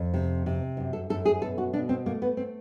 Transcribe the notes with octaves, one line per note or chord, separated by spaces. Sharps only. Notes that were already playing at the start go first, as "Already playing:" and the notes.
Already playing: F2
C3
C3
F#2
A4
F#2 A4
G#4
B2 A4
F#4
B2 D4
C4
A3 A#3
B3
C4